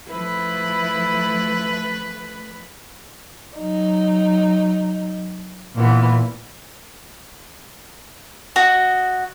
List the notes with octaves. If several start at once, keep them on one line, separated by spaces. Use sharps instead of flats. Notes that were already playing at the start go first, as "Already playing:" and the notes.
F3 A3 E4 B4
F#3 D#4
A#2 E3 B3
F#4 D#5